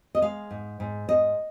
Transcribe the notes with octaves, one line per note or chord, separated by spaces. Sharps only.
D#5
G#3 F5
G#2
G#2
G#2 D#5